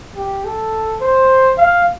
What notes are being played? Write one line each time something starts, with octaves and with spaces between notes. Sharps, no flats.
G4
A4
C5
F5